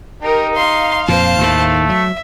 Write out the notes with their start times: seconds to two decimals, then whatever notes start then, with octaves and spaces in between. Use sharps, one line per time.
0.22 D#4 G4 A#4
0.57 F5 C6
1.08 F2 A#2 C5 A5
1.39 D#2 A2 D#3 A3
1.89 F#3 E5